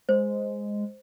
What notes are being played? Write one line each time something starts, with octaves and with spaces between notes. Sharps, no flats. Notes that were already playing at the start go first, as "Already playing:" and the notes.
G#3 C5